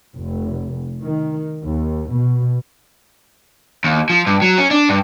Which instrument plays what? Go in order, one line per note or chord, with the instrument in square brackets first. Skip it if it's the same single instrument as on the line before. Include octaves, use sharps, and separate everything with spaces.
[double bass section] F1
D#3
D#2
B2
[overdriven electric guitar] D#2
F3
G2
F#3
C#4
D4
G2